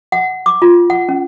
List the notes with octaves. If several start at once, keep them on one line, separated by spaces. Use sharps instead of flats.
F#5
D6
F4
F#5
C#4